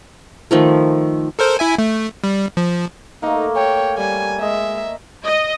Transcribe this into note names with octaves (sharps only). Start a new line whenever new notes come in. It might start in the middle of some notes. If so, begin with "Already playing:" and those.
D#3 F3 A3
A4 A#4 C5
E4 E5 G#5
A3
G3
F3
A3 A#3 D#4
C#5 G5
G3 G#5
G#3 D#5 E5
D#5